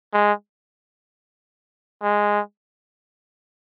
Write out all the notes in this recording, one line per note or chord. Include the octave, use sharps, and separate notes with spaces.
G#3
G#3